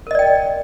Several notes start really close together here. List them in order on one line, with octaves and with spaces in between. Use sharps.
A#4 D#5 D5 G5